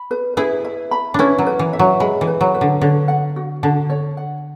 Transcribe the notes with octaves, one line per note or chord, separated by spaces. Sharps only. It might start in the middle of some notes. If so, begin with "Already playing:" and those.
Already playing: B5
B4
E4 G#4 B4
E5
B5
C#4 D4 E4 B4
F#3
B4
E3
E5
F#3
G#3 B5
E3
B4
F#3
B4
D3
D3 C#5
F#5
F#4
D3 A5
C#5
F#5